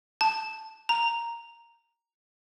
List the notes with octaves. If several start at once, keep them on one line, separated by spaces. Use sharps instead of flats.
A5
A#5